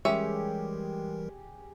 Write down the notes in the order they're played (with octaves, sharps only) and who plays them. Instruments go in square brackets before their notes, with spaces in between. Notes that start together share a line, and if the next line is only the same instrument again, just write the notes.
[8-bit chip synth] E3 G3 A#4 [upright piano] G#3 [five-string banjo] C#4 E5 [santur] G4 G#4